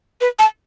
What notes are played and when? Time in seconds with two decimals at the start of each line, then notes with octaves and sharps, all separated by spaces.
0.21 B4
0.39 A5